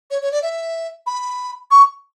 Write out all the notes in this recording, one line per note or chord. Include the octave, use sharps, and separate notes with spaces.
C#5
C#5
D5
E5
B5
C#6